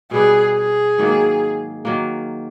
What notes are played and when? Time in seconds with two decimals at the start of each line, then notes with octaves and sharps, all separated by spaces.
0.11 B2 G3 B3 G#4
0.55 G#4
0.98 G#2 D#3 F#3 A#3
1.85 D#3 F#3 A#3